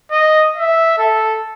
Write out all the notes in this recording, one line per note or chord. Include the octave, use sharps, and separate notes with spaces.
D#5
E5
A4